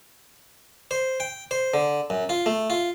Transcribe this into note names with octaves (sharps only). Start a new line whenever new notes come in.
C5
G5
C5
D3
F#2
F4
A3
F4